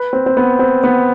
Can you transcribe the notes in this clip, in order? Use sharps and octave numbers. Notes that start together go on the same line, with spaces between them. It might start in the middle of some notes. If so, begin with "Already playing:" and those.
Already playing: B4
C4
C4
B3
C4
B3